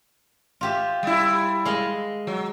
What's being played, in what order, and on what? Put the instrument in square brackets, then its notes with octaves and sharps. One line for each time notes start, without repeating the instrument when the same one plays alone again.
[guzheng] F4 G4 E5
[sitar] G3 E4
[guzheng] G#3 D#5 F5
[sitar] F#3